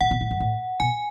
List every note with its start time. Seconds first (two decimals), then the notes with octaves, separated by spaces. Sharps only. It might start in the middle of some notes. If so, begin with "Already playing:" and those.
0.01 A2 F#5
0.11 B2
0.21 A2
0.31 F#2
0.40 A2
0.80 B2 G#5